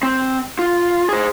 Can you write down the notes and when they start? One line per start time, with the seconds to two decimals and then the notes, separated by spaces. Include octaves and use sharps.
0.03 C4
0.59 F4
1.09 G#4 C5